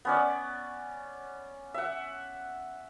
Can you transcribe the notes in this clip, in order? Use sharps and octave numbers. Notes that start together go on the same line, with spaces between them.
B3 C#4 D5
E5 F#5